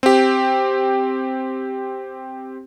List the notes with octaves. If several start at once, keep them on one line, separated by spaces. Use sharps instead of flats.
C4 G4